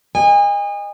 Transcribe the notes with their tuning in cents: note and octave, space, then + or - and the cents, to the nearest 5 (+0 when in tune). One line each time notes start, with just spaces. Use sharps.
D#5 -20 G#5 -35